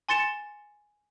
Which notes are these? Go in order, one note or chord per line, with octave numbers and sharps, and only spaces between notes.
G#5 C6 A6 C#7 E7